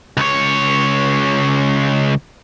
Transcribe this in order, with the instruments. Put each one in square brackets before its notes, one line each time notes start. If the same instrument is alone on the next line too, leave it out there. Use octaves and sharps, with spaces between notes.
[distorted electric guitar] C#2 C#5